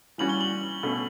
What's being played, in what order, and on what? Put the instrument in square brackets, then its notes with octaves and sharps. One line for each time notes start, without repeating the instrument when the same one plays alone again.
[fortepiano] E3 G3 C#4 F#4 [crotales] F#7
[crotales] G7
F#7
[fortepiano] B2 A3 C#4